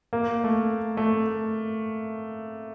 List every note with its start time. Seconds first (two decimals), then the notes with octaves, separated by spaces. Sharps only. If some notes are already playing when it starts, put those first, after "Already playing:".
0.13 A#3
0.44 A3
0.97 A3